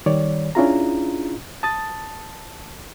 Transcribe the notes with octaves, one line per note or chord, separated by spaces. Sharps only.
D#3 G3 C#5 D5
C#4 D4 E4 F4 G#4 A#5
A5 D#6 A6